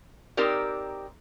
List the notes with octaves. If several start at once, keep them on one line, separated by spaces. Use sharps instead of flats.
C4 D#4 G4 A#4 D5